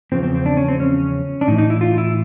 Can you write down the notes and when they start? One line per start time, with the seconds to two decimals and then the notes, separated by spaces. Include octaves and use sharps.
0.12 E2 C#3 F3 C4
0.23 C4
0.35 C4
0.46 D4
0.57 C#4
0.68 C4
0.80 C#4
1.41 D4
1.47 A2 D#4
1.51 E3
1.58 D#4
1.70 E4
1.81 F4
1.98 E4